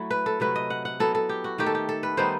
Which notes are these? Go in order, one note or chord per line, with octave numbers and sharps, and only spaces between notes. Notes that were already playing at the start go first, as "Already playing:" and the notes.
Already playing: F#3 A3 E4
B4
A4
C3 F#3 A3 B4
D#5
F#5
F#5
F#3 B3 E4 A4
A4
G4
F#4
D#3 A3 D#4 G4
A4
G4
A4
B4
D#3 G3 B3 D#4 C5